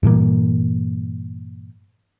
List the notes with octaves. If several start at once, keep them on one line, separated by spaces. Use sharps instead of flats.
G2 A#2 E3 A#3